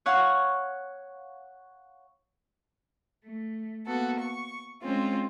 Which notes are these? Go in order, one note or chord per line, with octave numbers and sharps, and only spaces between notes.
C#5 F5 F#5
A3
A#3 B3 F#4 A4
C#6
G#3 C4 C#4 F4